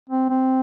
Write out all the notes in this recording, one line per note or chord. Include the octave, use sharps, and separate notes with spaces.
C4
C4